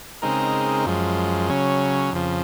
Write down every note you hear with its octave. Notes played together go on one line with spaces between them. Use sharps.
C#3 G#3 C4 D#4 A#4
F#2 F3 G#3
C#3 F#3 C#4
F2 C#3 F3